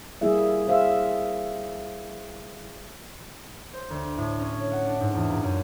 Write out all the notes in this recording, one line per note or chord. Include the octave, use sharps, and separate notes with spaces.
G3 A#3 E4 G#4 E5
G#4 C5 E5 F5
C5
D2
A2
C#4
C#5
F#5
D4
G#2
E2
A#2
F#2